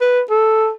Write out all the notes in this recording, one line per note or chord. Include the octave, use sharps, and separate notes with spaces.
B4
A4